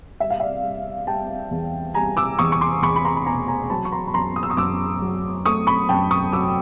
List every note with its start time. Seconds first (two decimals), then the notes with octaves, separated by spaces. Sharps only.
0.20 G3 E5
0.30 F5
0.40 D5 E5
0.63 G3
1.07 G3 G5 A5
1.51 E2
1.94 G3 G#5 A#5
2.17 D6 E6
2.39 E2 C#6 D#6
2.52 C#6
2.61 C6 D6
2.82 E2 B5 C#6
2.96 B5
3.05 A#5 C6
3.16 B5
3.26 B2 G#5 A#5
3.48 G#5 A#5
3.70 F#3 A5 B5
3.85 C#6
3.92 A#5 C6
4.07 B5
4.14 F#2 A#5 C6
4.36 D#6
4.43 E6
4.50 C#6 D#6
4.57 F#2 D6 E6
5.02 F#3
5.46 A3 C#6 D#6
5.67 B5 C#6
5.89 F#2 G5 A5
6.11 C#6 D#6
6.32 F#3 D6 E6